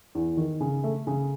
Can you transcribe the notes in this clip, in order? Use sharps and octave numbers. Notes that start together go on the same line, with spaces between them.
E2
D#3
C#3
A3
C#3